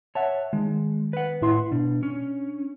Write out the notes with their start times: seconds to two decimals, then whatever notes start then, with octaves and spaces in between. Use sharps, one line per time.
0.15 C#5 E5 F#5 A5
0.53 D#3 G#3
1.13 B4 F#5
1.42 A2 E4 C6
1.72 B2 D4
2.03 C#4